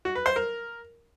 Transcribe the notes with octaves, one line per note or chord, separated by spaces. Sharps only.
F#4
B4
C5
A#4